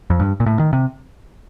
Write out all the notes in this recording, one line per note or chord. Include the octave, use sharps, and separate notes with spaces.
F2
G2
A#2
A2
D#3
C3